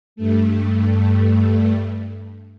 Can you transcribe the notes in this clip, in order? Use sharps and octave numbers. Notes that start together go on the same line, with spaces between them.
G2 A3